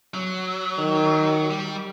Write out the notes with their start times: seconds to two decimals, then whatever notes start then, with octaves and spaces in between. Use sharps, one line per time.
0.14 F#3
0.78 D#3
1.50 G3